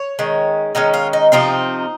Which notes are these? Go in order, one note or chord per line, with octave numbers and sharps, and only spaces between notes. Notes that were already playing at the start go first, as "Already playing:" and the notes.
Already playing: C#5
D#3 G#3 C#4
D#3 G#3 C#4 D#4
F4
D#4
C3 F3 C4 D#4